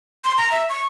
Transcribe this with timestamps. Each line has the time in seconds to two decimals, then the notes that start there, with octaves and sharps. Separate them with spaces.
0.25 C6
0.37 A#5
0.52 E5
0.69 C#6